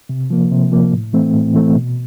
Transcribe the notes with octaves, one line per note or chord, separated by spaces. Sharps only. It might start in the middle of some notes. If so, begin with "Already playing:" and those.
C3
F3 A#3
C3
F3 A#3
A2
E3 A3 C4
A2
E3 A3 C4
B2